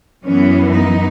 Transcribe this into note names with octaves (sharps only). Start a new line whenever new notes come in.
F#2 E3 B3 C#4
D#4